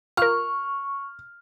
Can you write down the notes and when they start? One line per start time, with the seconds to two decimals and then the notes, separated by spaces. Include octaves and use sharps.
0.17 F4 A#4 C#6 F6